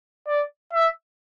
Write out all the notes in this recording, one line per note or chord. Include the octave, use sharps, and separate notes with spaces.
D5
E5